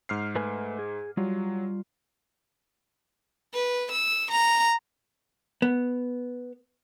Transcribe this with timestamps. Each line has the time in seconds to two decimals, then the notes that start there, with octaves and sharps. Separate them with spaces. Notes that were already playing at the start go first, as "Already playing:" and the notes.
0.09 G#2 F6 C7
0.36 A3 B4 G#5
0.79 G#4
1.17 F#3 G3 F4
3.54 B4
3.92 E6
4.31 A#5
5.62 B3